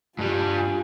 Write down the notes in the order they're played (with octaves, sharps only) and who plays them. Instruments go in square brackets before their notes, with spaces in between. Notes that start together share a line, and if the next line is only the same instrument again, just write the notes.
[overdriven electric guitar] G2 G3 [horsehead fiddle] F4 G#5